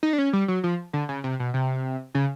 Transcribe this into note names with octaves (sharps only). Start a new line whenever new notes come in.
D#4
D4
C#4
G3
F#3
F3
D3
C#3
C3
B2
C3
C#3